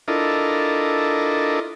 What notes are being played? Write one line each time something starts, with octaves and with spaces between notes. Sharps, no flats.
D4 E4 F4 A4 A#4 D#5